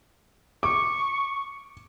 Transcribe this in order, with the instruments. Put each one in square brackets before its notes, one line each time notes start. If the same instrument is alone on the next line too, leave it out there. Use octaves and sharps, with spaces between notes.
[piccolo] C#6 [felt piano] D6